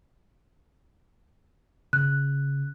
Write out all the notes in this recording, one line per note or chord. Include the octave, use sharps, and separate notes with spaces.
C#3 F#6